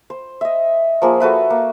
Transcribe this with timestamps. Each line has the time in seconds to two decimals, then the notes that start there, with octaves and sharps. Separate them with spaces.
0.10 C5
0.41 D#5 E5
1.02 F3 A#3 G#4
1.20 F#4 A4 B4 E5
1.50 A#3